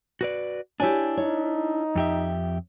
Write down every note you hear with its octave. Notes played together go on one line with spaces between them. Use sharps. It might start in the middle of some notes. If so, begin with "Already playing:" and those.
F#4 B4 D5
D4 E4 G4 C#5 G#5
D#4 C#5
F2 G4 E5